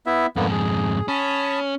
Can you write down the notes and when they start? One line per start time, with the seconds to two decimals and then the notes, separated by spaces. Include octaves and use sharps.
0.06 B3 E4 E5
0.36 F2 G#2 D3 A#3 B3
0.52 G#4
1.08 C#4 A5 B5 D#6